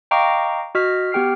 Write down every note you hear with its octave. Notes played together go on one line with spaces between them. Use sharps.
D#5 F5 G5 A#5 C#6 D6
F#4 D#5 F6 B6
B3 G4 G5 F6 C7